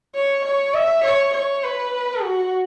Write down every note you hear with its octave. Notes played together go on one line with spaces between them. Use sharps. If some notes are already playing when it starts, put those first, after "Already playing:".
C#5
C#5
E5
C#5
C#5
B4
F#4